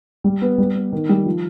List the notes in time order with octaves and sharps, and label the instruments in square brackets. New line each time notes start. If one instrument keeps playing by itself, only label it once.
[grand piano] G3
B3
G3
B3
D#3
G3
F3